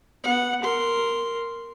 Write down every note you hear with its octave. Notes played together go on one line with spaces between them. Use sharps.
B3 F#5
A#4 C6